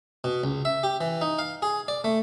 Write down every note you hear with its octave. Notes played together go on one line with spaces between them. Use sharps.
B2
C#2
E5
G4
E3
D#4
F5
G#4
D5
A3